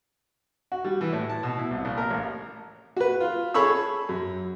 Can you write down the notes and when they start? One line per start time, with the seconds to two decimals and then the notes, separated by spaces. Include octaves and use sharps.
0.72 F#4
0.84 G3
1.01 E3
1.13 A2
1.29 A5
1.43 B2
1.57 E4
1.71 C2
1.85 A#1
1.98 A#4
2.10 A1
2.96 F#4 B4
3.20 F4
3.54 G#4 A4 C#5 B5 C#6 E6
4.09 F#2